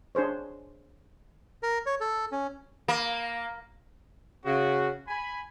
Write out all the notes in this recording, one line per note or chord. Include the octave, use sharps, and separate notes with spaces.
D4 G#4 C5 C#5
A#4
C#5
A4
C#4
A#3
C#3 F#4
G#5 B5